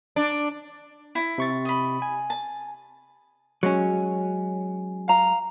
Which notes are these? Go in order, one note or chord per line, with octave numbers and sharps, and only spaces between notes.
D4
E4
C3 C#6 A6
D#5 B5
G#5
A5
F#3 G#3 C#4
F5 A#5